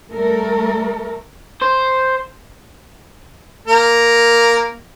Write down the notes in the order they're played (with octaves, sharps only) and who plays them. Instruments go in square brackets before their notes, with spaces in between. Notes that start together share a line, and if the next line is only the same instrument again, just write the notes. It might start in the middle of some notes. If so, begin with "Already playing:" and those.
[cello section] G3 A3 A4 A#4
[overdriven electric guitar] C5
[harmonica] A#3 A#4